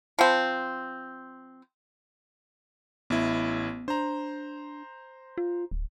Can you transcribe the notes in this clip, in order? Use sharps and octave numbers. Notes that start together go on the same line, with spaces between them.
F3 C4
A1 B3 E4
D4 C5 A#5
F4
D1